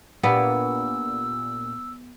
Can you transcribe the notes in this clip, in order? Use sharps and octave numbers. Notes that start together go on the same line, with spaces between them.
A#2 B3 D4 G4 E6